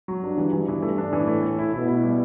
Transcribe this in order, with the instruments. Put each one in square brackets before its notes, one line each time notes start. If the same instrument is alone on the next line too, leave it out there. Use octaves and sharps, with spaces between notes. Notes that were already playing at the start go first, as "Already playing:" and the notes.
[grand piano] F#3
[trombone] G2 [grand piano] D4
[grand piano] E3
E3
E3
A3
D4
[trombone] A2 [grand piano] E3
[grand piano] A3
A3
E4
[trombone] B2 [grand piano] E4
[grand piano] E4
G3